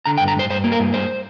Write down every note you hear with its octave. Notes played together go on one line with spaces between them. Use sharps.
D3 A#5
G5
G2
A#5
G2 C5
G2 C5
A#3
A#4
G2
G2 C5